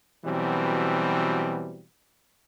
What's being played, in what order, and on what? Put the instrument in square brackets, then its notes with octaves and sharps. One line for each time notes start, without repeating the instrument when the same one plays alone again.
[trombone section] B2 E3 F#3 G3 C4